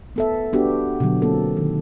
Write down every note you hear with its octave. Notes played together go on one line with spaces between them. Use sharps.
B3 A4 E5
B3 D4 F#4 G4
B2 D3 F#3
A#3 C4 A4
D#3